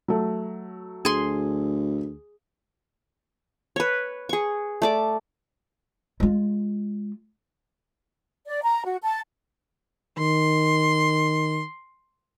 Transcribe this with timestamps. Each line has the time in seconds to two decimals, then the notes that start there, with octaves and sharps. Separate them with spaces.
0.08 F#3 A3
1.05 D2 G#4 C6
3.76 B4 C#5
4.29 G#4 C#6
4.82 A3 D5 D6
6.20 G#3 F4
8.47 D5
8.63 A#5
8.85 F#4
9.02 A5
10.18 D#3 C6